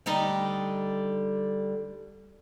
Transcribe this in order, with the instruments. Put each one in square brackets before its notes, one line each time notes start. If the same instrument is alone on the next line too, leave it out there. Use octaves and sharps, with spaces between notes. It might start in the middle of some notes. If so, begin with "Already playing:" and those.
[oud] D3 G3 D#4